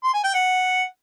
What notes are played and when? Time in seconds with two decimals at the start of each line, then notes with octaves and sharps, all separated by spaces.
0.04 C6
0.14 G#5
0.24 G5
0.34 F#5